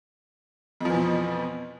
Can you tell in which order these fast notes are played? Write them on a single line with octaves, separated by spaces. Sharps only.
F2 F3 E3 B2